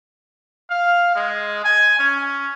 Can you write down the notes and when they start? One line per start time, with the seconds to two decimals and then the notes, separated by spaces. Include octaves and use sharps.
0.70 F5
1.16 G#3
1.64 G#5
1.99 C#4